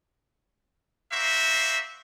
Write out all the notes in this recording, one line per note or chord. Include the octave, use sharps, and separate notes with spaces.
A#3 F#4 C5 E5